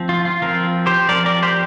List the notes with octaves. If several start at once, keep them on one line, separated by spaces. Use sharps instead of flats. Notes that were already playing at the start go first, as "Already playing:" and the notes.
Already playing: F3 C4
F4
F4
F3 C4 F4 A#4
G4 C5
F3 C4 A#4 D5
A#4 D5
G4 C5